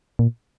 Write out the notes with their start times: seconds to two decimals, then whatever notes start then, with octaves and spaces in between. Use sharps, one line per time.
0.19 A#2